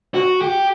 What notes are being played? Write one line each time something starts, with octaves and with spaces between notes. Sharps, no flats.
F#4
G4